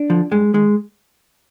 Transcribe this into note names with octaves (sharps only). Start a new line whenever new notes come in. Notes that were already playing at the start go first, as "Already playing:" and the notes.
Already playing: D4
D3 F3
G2 G#3
D#3 G#3